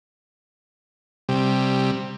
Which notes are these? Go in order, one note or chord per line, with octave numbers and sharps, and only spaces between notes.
C3 G3